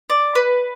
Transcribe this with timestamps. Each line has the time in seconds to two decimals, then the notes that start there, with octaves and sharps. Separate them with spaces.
0.10 D5
0.35 B4